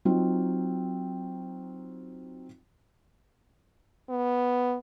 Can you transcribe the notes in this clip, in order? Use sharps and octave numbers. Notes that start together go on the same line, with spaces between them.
F#3 C4 D#4 F4
B3